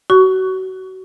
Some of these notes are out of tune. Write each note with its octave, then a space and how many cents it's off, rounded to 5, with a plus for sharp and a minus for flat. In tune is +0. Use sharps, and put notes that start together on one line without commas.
F#4 +25 C#6 +20